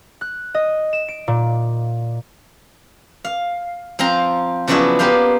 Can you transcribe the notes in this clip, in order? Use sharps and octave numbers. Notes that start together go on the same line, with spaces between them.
F#6
D#5
E7
D7
A#2
F5
F3 C4 F4 A#5
C#3 F3 F#3 B3 D4 E4
A#3 B3 G4 C5 F5